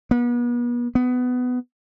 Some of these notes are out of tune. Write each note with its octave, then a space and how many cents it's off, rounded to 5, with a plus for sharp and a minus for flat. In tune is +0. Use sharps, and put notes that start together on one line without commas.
B3 -40
B3 +15